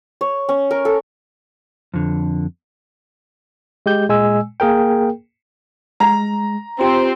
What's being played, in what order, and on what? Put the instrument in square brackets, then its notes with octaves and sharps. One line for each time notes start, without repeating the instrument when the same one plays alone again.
[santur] C#5
C#4
A#4
A4
[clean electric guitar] F2 D3
[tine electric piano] G#3 G4 G6
A#2 G#3 G#5 E6
A#3 G#4 A#4 G5
[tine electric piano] G#3 [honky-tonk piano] A#5
[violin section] C4 [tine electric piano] F4 G4